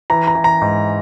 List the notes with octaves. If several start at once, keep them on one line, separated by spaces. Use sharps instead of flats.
E3 A#5
A#5
E3
A#5
G#2